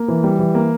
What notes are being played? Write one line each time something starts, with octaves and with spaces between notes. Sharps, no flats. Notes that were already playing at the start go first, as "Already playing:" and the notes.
Already playing: A#3
E3
G3
E3
A#3